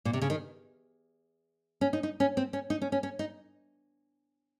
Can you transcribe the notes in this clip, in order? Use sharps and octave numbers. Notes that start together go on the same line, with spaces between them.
A#2
C3
C#3
D#3
C#4
D#4
D#4
C#4
C4
C#4
D#4
C#4
C#4
C#4
D#4